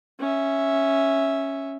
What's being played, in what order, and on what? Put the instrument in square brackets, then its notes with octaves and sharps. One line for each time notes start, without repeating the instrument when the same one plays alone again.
[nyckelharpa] C#4 E5